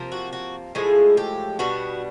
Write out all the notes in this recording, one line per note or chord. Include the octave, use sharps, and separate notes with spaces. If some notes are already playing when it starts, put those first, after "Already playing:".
Already playing: C3 F3 A#3
F#4
F#4
A2 F3 G#3 G#4
G4
B2 G3 B3 D4 F#4